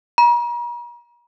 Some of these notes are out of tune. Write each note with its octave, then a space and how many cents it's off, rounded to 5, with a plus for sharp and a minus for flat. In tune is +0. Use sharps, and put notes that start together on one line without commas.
A#5 +45